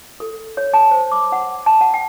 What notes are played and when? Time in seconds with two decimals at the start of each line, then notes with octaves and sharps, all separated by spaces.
0.20 A4
0.57 C#5
0.74 A5
0.91 C5
1.12 D6
1.32 F#5
1.66 A5
1.81 F#5
1.94 G5